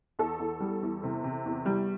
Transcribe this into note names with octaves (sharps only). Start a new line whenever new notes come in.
E2 A4
E2
G3
E2
C3
C3
E2
G3